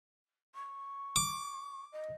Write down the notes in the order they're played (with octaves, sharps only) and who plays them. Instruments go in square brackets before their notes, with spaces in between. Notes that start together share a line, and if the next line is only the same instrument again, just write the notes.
[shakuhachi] C#6
[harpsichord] D6
[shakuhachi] D#5